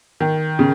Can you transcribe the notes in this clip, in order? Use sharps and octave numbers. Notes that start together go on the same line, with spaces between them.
D#3
C#3